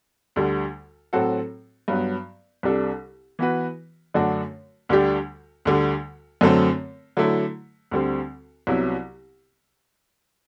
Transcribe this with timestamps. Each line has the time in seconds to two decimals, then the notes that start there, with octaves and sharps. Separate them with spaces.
0.36 D2 D3 G3
1.13 A2 F#3 C4 F#4 A4
1.88 G2 F#3 B3
2.63 C2 C3 G3 D4 A4
3.39 E3 B3 F#4 B4
4.14 F#2 D3 A3 D4 F#4
4.89 D2 D3 G3 D4 G4
5.65 D2 D3 G3
6.41 F#2 D3 F#3 A3 C4
7.17 D3 F#3 A3 E4
7.91 D2 D3 G3 C4
8.67 C2 C3 F#3 B3 E4